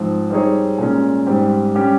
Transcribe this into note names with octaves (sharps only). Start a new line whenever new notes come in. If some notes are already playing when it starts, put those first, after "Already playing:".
Already playing: G#2 F3 C4
G3 C4 D#4 G#4 C#5
A#2 G#3 C#4
G#2 G3 C4 G4
G3 C#4 G4